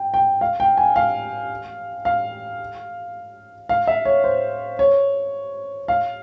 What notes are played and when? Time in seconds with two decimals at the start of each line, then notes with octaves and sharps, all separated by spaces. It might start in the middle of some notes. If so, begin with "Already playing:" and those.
Already playing: G5
0.14 G5
0.41 F5
0.60 G5
0.77 G#5
0.96 F5
2.05 F5
3.69 F5
3.87 E5
4.05 C#5
4.24 C5
4.79 C#5
5.88 F5